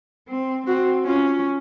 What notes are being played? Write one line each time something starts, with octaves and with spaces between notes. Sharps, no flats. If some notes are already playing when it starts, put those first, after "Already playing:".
C4
C4 F#4
C#4 F4